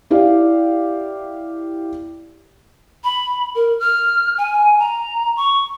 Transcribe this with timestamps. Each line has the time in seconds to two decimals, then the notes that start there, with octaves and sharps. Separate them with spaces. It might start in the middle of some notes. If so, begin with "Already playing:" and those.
0.10 E4 G4 D5 F5
3.04 B5
3.55 A#4
3.80 F6
4.38 G#5
4.79 A#5
5.37 C#6